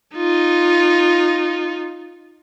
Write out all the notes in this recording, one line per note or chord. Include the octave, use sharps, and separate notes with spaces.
D#4 F4